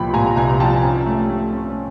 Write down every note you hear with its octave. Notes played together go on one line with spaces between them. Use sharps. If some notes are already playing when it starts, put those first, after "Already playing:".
Already playing: C2 A#2 F3 G5 B5
A#2 G#5 A#5
C2 G#5 A#5
F3 G5 A5
C#4
A3
A3
C#4